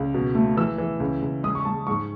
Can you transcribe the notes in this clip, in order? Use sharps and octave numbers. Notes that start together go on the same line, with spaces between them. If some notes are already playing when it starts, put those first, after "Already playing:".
Already playing: C#2
B2
A3
E3 E6
E3
C#2
C#2
G#3 D#6
C#6
G#3 A5
G#2 C#6